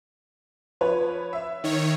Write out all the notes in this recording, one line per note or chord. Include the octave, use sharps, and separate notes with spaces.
F3 B4 C#5
E5
D#3 C#5